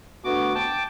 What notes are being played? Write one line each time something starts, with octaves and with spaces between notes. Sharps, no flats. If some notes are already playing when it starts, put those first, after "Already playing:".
D2 B3 F#4 D6
G5 A5 D6